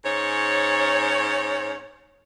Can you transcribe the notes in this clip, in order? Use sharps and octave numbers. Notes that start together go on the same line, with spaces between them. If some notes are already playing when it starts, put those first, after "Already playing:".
G#2 C#4 C#5